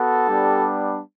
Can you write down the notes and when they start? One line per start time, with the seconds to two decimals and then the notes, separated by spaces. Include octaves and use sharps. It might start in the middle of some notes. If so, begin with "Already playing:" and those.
Already playing: B3 F#4 A4
0.27 G3 B3 D4 G4